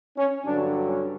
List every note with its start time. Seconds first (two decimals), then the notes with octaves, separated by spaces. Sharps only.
0.17 C#4
0.46 G2 D3 F#3 D4
0.88 C#4